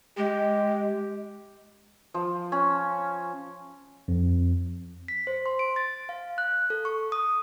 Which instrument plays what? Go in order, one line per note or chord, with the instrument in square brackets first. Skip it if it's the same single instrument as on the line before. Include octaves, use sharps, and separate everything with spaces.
[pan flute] G#3 [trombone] G4
[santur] F3
C#4
[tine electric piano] F2
[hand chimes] B6
C5
C6
D7
A6
F5
F#6
A4
C#6
D#6